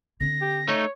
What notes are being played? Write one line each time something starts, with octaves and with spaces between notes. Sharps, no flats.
D3 C4 A#6
G4
A3 D#4 C#5